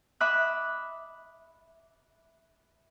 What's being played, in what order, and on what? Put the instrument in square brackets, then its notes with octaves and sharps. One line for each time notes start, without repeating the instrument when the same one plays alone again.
[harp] E5 B5 D6 D#6 F#6